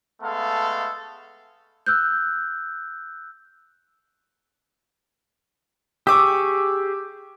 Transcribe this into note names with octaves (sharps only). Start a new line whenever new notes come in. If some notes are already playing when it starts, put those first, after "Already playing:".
G#3 A3 B3 A4 F5
E6 F#6 G6
G4 G#4 C#6 D6 E6